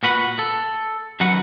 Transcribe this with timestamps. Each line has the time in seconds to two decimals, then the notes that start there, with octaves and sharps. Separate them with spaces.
0.03 A#2 F#4 B4 F#5 B5
0.39 A4
1.20 F#2 D#3 F#3 F#4 B4 F#5